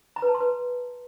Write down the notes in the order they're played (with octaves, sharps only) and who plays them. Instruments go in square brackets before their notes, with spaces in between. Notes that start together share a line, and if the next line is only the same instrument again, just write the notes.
[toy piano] A#5
B4
A5
C6
B4